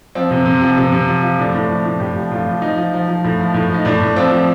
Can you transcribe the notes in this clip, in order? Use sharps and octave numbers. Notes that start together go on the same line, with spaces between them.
F3 C4
C3
C3
F3
C3
C3
F3
F3
A2 D4
A2
F3
A2
A2 G4
F3
A2 F4
F3
F3 D#4
F3
F3
F3
A2
F3
A2
F3 D#4
A2 D4
A2
F3 C4
F3